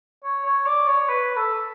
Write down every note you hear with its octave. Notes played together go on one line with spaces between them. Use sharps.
C#5
C#5
D5
C#5
B4
A4